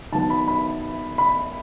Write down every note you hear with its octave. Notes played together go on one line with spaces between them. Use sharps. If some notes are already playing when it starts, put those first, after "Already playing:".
D#3 F#3 B3 A5
B5
B5
B5